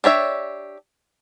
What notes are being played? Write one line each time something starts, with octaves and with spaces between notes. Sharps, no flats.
D4 G4 C#5 E5